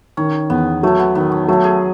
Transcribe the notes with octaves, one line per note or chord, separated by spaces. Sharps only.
D#3 C#4
E2 B3
F#3 A3
B3
D#3 B3
C#4
F#3 A3
G#4